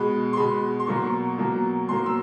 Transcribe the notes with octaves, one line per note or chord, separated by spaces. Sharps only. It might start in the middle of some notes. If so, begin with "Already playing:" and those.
Already playing: B2 G#3 B5
C6
B2 G#3 B5
C6
B2 F#3 A#3 C#6
B2 F#3 A#3
B2 F#3 A#3 C6
E6